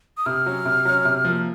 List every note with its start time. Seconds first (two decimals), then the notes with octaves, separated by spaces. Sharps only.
0.17 D#6
0.26 C3 F6
0.46 F#3 C#4
0.65 C3
0.85 F#3 C#4
1.05 C3
1.25 F3 A#3